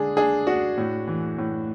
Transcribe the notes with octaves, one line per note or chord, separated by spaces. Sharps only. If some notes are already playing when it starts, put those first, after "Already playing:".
Already playing: D3 G#3 D4 G#4
D4 G#4
D4 F#4
A2
E3
A2